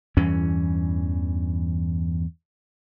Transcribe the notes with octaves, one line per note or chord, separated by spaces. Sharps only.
E2 G2 E3 C#4